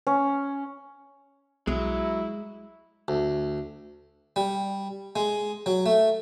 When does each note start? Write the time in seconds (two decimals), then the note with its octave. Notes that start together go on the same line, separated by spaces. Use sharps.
0.07 C#4
1.67 B1 F#3 G#3 E4
3.08 D2
4.36 G3
5.16 G#3
5.66 F#3
5.86 A3